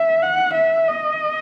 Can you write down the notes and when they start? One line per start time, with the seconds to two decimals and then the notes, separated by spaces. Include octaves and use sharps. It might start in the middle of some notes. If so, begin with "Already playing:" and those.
Already playing: E5
0.22 F#5
0.54 E5
0.88 D#5